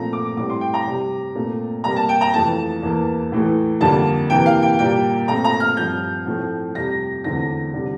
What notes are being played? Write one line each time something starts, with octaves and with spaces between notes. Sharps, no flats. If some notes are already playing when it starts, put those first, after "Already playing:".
Already playing: A#2 F3 A3 C4 A#5
D6
A2 G3 C4 D6
C6
G5
A#5
C3 G3 C4
A#2 A3 C4
C3 G3 A#3 A#5
A5
G5
A#5
F2 E3 A3 A5
E2 E3 A#3
A2 E3 A3
F2 D3 G3 A#3 A5
C3 E3 A#3 G5
F5
G5
A#2 G3 A#3 G5
A#2 A3 C4 A#5
A#5
F6
G2 F3 C4 G6
A2 F3 A3 C4
F2 C3 G3 A#6
E2 D3 A3 C4 A#6
D3 G3 C4